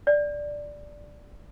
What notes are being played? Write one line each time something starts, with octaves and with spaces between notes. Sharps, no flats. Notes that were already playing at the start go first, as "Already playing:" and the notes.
D5